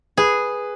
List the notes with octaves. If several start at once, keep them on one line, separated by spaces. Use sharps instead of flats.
G#4 B4